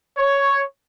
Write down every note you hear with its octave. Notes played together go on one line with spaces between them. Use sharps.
C#5